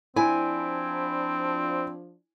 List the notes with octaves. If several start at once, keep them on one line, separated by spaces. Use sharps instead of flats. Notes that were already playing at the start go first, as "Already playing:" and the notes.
F3 C4 D4 E4 G#5